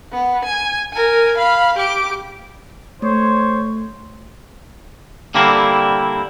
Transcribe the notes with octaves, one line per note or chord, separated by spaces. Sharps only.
B3
G#5
A#4 G#5
F5 B5
G4 D6
A3 C5 C#5
D3 G3 A#3 C4 E4